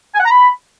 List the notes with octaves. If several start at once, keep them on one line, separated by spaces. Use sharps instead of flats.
G#5
F#5
A#5
B5